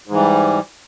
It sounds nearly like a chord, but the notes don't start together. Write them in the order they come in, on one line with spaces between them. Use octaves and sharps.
G#2 E3 G3